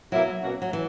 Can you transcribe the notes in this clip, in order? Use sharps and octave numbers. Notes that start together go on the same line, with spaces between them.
B2 F#3 A#3 E4
B2 A#3 C#4 F#4
F#3
E3